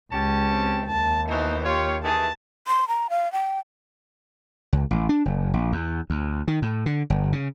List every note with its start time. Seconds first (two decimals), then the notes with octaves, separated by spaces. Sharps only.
0.12 C#2 C#4 G4 A5
0.50 C4
0.86 D#2 A5
1.29 B2 E3 D#4 C5
1.65 F4 G4 C#5
2.03 D#3 E3 G#4 A5
2.67 C6
2.88 A#5
3.10 F5
3.32 G5
4.73 C#2
4.91 A1
5.09 D4
5.25 F#1
5.54 A#1
5.72 E2
6.10 D2
6.48 D#3
6.62 A2
6.86 D3
7.10 G1
7.33 C#3